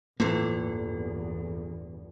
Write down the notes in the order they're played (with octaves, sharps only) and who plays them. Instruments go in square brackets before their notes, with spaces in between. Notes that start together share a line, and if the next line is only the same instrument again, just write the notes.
[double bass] G1 E2 [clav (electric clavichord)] A2 E3 C5 [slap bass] A#3 [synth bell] F4 A4